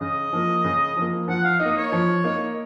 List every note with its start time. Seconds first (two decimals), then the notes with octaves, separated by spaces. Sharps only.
0.01 C#3 D#5
0.33 F3 A#3
0.64 C#3
0.97 F3 A#3
1.28 F3 F#5
1.44 F5
1.60 D#4 D#5
1.65 A#3
1.76 C#5
1.92 F3
2.24 A#3 D#4